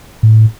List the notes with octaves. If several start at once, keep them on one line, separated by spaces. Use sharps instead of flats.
A2